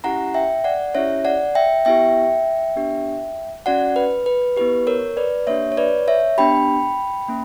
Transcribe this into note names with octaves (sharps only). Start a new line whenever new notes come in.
C#4 E4 G4 F#5 A#5
E5 G5
D5 F#5
C#4 E4 G4 C#5 E5
D5 F#5
E5 G5
B3 E4 G4 E5 G5
B3 D4 G4
C#4 F#4 D5 F#5
B4
B4
B3 E4 G4 B4
A#4 C#5
B4 D5
A#3 D4 G4 C#5 E5
C#5
B4 D5
C#5 E5
B3 D4 G4 G5 B5
A#3 C#4